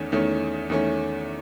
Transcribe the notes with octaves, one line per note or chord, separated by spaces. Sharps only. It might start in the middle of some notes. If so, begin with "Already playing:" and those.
Already playing: E2 D#3 A3 C#4
E2 D#3 A3 C#4
E2 D#3 A3 C#4